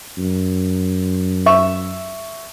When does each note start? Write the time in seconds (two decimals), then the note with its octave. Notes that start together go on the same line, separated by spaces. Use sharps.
0.18 F#2
1.46 E5 C#6